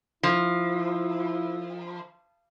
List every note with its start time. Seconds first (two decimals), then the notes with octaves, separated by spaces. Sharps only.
0.23 F3 E4